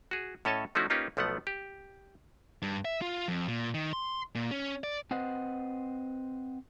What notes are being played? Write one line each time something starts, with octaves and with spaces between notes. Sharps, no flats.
F#4 G#4
A2 C#4 A4 C#5 D#5 A5
F3 A3 C#4 D#4 E4 F#4
A#3 C#4 D#4 F4 G4 B4
B1 F3 A3 B3 F#5
G4
G2
E5
F4
F2
A#2
D#3
C6
A#2
C#4
D5
C4 B4 C5 D#5 F#5